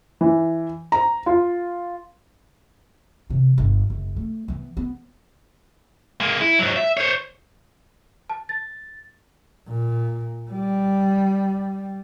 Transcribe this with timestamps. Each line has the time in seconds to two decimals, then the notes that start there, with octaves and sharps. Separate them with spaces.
0.21 E3
0.92 A#5
1.26 F4
3.30 C3 E3
3.58 G1
3.90 F#1
4.16 A3
4.48 E3 B3
4.77 B3
6.21 G#3 A#3
6.41 E4
6.59 G#2 F#3
6.76 E5
6.97 C5 C#5
8.30 A5
8.49 A6
9.68 A#2
10.51 G3